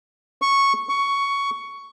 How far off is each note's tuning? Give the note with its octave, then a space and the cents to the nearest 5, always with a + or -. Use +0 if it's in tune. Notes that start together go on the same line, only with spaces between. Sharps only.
C#6 -5
C#6 +10